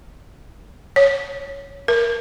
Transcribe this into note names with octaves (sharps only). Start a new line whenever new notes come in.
C#5
A#4